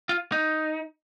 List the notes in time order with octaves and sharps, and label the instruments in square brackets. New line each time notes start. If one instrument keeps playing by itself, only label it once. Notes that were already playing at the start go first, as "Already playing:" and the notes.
[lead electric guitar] F4
D#4